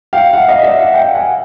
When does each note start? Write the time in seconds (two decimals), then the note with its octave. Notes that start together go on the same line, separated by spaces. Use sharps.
0.13 F5 G5
0.33 E5 F#5
0.48 D#5 F5
0.63 D5 E5
0.78 E5 F#5
0.94 F5 G5
1.14 F#5 G#5